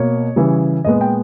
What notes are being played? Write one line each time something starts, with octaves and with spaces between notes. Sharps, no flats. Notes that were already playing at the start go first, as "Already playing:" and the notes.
Already playing: B2 A#3 C#5
C#3 E3 G3
A#2 G#3 B3 D#5
G5